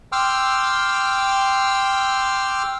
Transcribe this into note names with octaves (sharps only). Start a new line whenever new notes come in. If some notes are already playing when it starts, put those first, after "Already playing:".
G5 C6 D6 E6 F6